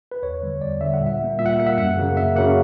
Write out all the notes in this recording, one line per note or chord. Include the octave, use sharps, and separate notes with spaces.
B4
E2 C#5
D3 G3
E2 D5
D3 G3 E5
F#5
A#2
E5
G3 A#3
A#2 E5
F#5
E5
G3 A#3 F#5
E5
F#2 F#5
C#3 F#3 A#3
F#2 E5
C#3 F#3 A#3 F#5